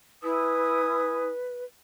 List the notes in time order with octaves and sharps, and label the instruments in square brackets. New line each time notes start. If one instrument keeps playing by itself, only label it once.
[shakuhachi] E4 [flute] B4 [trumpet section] G#5 D#6